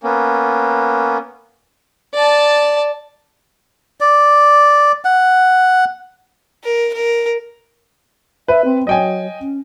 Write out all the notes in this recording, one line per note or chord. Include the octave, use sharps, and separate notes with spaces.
A#3 B3 C#4
D5 A5
D5
F#5
A#4
A#4
B4 E5
C4
F#3 D#5 G5 G#5
C#4